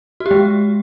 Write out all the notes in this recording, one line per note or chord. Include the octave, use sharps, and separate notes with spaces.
F#4
G4
G#3